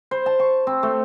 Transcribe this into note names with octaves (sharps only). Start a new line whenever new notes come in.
C5
A5
C#6
C4
A3